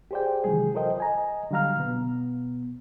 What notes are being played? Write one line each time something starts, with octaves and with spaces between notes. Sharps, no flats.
G4 G#4 C5 D5 G5
C3 D#3 E3 F#3 G#3 G#4
F4 A4 A#4 C5 D#5 G5
D#5 G#5 A#5
D3 F#3 G3 F5 A#5 F6
B2 B3